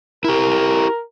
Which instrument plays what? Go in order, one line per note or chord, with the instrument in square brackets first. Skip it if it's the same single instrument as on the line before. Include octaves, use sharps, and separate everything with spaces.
[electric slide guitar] E4 G4 [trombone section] A#4